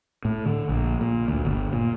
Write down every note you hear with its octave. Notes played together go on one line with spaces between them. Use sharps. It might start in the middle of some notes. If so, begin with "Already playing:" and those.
A2
D3
A#1
A#2
D2
G1
A#2